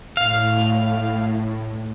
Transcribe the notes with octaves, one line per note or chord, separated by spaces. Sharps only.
A2 F5